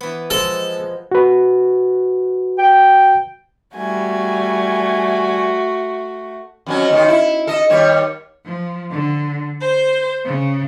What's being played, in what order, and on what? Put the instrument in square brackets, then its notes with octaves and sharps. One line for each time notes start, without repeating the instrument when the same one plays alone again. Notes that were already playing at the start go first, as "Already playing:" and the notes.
[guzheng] E3 B3
[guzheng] F3 G#3 [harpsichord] A4
[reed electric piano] F#4 B4
[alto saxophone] G5
[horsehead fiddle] G3 G#5 [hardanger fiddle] A3 F#4
[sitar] F2 F#3 C#4
D#2 D#3 G#3
E4
A4 D#5
D#2 G3 C#5
[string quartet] F3
D3
C5
C#3